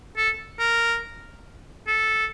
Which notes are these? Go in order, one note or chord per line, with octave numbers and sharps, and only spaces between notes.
A4
A#4
A4